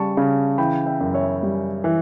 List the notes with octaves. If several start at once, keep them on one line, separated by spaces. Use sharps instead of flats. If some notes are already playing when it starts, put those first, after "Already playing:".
Already playing: C#3 G3 A5 C#6
C#3
E3 G5 B5
E5 G5
F#2
C#5 E5
G3
E3